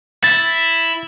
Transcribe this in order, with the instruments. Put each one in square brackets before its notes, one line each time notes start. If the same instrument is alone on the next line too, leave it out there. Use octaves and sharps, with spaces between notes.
[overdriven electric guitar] E4 [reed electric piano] A6